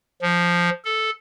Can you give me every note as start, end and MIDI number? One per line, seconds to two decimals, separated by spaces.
0.22 0.70 53
0.85 1.11 69